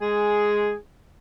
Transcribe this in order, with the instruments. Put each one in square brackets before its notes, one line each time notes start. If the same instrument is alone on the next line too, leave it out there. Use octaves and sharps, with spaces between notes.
[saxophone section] G#3 G#4